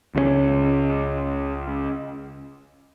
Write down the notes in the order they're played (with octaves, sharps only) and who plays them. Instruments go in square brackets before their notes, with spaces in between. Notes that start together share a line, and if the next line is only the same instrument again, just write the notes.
[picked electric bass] C#2 C#3 A3 C#4